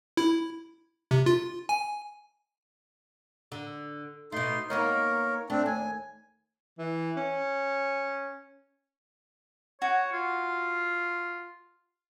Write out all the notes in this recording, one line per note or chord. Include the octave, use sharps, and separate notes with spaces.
E4
C3
F4
G#5
D3
B2 A3 D#4 C6
A#3 B3 D#4 A#4 C#5
A3 C4 D4
D#2 G#5
E3
C#4
F#4 C#5
F4